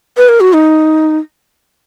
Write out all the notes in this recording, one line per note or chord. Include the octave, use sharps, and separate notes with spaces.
B4
A#4
F#4
D#4